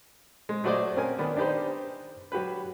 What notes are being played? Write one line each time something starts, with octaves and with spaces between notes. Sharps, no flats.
G#3
F#3 A3 F#4 C5 D5 D#5
C4 C#4 A#4 G#5
D#3 B3 D4
D4 D#4 G4 B4 C5
F#3 F#4 G4 B4